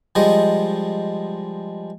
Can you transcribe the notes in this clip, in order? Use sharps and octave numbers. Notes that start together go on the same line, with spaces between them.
F3 G3 G#3 D#5